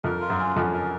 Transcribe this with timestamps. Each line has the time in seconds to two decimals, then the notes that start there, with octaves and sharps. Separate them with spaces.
0.04 F2 A#4
0.21 F4
0.30 F#2
0.39 C#4
0.56 F2 C#4
0.73 A#4